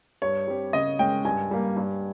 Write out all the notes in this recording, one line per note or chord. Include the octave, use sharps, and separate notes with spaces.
G2 C#5
G3 C4 G4
C#3 D#5
G#3 C#4 G5
G2 G#5
G3 A#3
G2